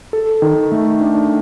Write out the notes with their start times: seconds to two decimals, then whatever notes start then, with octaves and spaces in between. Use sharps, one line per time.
0.13 A4
0.42 D#3
0.72 A3
1.01 D4